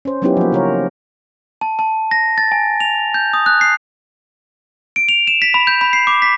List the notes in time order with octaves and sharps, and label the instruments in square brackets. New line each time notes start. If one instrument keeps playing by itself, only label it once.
[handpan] C#4 C5
F#3 B3 C#4 D#4 E4 G4
F3 A#3
C#3 A#4 C#5
[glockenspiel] A5
A5
A#6
A6
G#5
F7
G6
D#6
F#6
C7
D7
F7
E7
B6
B5
G6
B5
C7
D6
B6